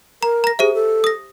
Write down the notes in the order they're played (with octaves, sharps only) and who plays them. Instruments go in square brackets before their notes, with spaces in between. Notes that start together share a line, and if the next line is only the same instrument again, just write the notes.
[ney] A#4 [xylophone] A#5
[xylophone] A#5 A#6
[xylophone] G4 C5 E5 [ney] G#4
[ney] A4
[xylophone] D#6 A#6